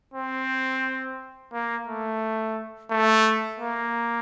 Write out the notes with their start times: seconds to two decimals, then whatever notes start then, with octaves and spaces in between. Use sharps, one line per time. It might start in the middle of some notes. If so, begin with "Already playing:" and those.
0.14 C4
1.53 A#3
1.87 A3
2.91 A3
3.60 A#3